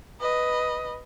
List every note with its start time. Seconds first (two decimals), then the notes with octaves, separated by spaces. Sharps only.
0.20 B4 D#5